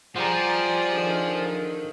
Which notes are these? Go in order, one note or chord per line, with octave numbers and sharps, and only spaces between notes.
F3 G3 F4 G#4 D5 F#5 A#5
D3 D#3